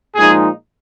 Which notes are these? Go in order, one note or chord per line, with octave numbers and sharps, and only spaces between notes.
A#2 F3 G#3 D#4 G#4